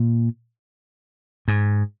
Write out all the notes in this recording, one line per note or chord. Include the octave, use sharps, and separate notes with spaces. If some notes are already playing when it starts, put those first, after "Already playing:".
Already playing: A#2
G#2